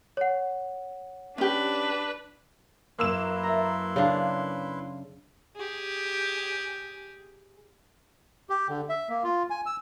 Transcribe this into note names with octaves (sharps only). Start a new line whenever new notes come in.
C#5 F#5
C#4 D4 G4 B4
F#2 A#3 E4 B4 C6 E6 F#6 E7
A4 E5 A#5
C#3 D4 F5
G4 G#4
G4
D3
E5
A#3
F4
G#5
E6